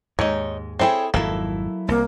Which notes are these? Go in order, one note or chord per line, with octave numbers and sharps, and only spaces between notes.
D#2 G#2 G#3 D#4 C#5
C4 E4 G#4 A4 C#5 G5
G#1 F2 F#3 A#3 E4 A4
C2 A#3